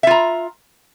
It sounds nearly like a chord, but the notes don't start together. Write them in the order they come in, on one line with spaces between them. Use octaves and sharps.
E5 F4 A#5